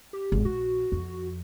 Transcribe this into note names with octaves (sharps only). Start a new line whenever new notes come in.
G4
G#1
A#1 F#4
F2